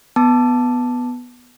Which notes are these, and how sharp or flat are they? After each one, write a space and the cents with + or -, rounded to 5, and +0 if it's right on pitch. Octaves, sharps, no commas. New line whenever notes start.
B3 +0 A5 +0 D6 +5